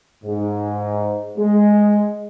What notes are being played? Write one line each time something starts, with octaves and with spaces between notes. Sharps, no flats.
G#2
G#3